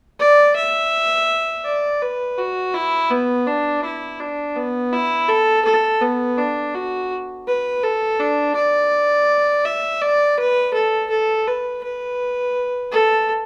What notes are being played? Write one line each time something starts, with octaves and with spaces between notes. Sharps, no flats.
D5
E5
D5
B4
F#4
E4
B3
D4
E4
D4
B3
E4
A4
A4
B3
D4
F#4
B4
A4
D4
D5
E5
D5
B4
A4
A4
B4
B4
A4